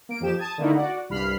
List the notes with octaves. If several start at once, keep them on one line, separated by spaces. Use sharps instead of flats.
A#3 D7
F2 F3 G4 E7
A5 D#6 G#6
D3 A3 A#3 D#4 E4
F#4 D5 F#5
C2 G2 B5 F6 C7